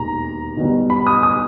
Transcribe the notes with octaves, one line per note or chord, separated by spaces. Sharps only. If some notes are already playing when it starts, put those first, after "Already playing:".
Already playing: E1 D#2 A#5
B1 B2 G3
B5
D#6
D#6